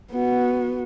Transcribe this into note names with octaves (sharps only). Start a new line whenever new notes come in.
B3 F#4